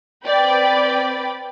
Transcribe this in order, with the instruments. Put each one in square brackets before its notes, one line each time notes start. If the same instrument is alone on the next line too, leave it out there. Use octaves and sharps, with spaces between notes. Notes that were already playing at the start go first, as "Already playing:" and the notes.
[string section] C4 B4 D5 G5 B5